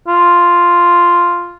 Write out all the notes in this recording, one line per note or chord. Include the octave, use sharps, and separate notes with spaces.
F4